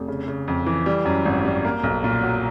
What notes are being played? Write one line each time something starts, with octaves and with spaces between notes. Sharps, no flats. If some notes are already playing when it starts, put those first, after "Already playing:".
Already playing: F1
C#3
C#3
F2
E3
G3
F#2
G#1
G3
A#3
B1
A#2
F#3